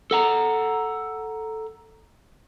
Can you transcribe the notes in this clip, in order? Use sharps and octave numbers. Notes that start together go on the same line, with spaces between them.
A4 F#5 A#5